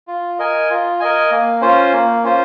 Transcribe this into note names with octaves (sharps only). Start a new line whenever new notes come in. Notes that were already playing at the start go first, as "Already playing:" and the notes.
F4
A#4 D#5 G#5
F4
A#4 D#5 G#5
A#3
C#4 F4 C5
A#3
C#4 F4 C5